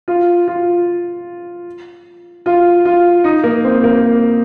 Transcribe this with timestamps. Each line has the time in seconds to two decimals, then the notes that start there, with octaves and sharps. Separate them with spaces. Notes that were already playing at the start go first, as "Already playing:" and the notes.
0.08 F4
0.48 F4
2.46 F4
2.85 F4
3.24 D#4
3.44 A#3
3.64 C4
3.84 A#3